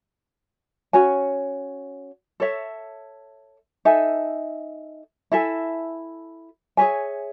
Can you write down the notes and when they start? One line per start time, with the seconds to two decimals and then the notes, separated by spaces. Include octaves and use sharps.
0.93 C#4 F#4 C#5 G#5
2.40 A4 C#5 E5
3.85 D#4 A4 E5 G#5
5.32 E4 A4 E5 G#5
6.77 G#4 C#5 E5 G#5